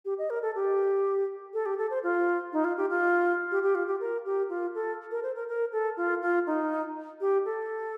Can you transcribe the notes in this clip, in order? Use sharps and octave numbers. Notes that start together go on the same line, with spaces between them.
G4
D#5
A#4
A4
G4
A4
G4
A4
C5
F4
D#4
F4
G4
F4
G4
G4
F4
G4
A#4
G4
F4
A4
A#4
C5
A#4
A#4
A4
F4
F4
D#4
G4
A4